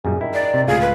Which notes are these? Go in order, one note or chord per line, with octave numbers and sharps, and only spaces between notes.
F#2 A#2 G3 G#4
D#3 E4
D5
C3
C#2 A2 F4 G#4
B4